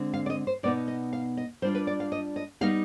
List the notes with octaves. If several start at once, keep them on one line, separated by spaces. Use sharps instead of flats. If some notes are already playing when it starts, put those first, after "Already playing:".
Already playing: D3 G#3 C4
F5
D5
D#5
C5
B2 B3 D#4 D5
D#5
F5
D#5
G3 D4 F4 C5
B4
D5
F5
D#5
D#5
G3 B3 D#4 F5